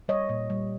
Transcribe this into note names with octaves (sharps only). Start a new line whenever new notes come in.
G3 C#5 D#5
A#2
G3